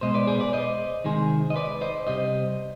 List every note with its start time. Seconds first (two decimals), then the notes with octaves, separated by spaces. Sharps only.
0.01 B2 G#3 C5 D#5
0.14 B4 D5
0.27 G#4 C5
0.40 B4 D5
0.53 C5 D#5
1.04 C3 D#3 G#3 G#4 C5
1.50 D#5
1.56 B4 D5
1.81 C5 D#5
2.07 C3 G3 C5 D#5